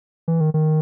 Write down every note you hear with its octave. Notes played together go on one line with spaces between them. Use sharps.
E3
D#3
D#3